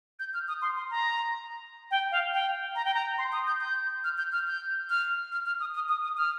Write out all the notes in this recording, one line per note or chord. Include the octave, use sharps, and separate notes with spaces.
G6
F6
D#6
C6
C6
A#5
G5
F5
G5
A#5
G5
A#5
C6
D#6
G6
G6
F6
G6
F6
G6
F6
F6
F6
D#6
D#6
D#6
D#6
F6